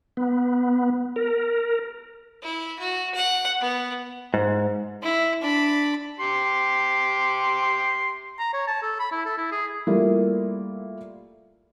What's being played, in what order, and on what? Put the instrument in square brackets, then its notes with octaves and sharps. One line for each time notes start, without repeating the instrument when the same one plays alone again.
[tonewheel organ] B3
A#4
[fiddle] E4
F#4
F#5
B3
[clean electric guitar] G#2
[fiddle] E4
D4 B5
[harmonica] G4 C6
[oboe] A#5
C#5
A5
A4
B5
E4
A4
E4
G#4
[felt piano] G3 A3 A#3 E4 F4 A#4